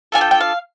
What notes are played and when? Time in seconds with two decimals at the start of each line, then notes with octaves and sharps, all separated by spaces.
0.12 D4 F4 A4 G#5
0.21 G5
0.31 G5
0.41 F5